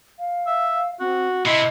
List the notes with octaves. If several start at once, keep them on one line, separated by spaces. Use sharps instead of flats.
F5
E5
C4 F#4
C3 E4 D#5